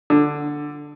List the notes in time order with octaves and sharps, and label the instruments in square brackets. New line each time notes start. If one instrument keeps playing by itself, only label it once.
[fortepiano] D3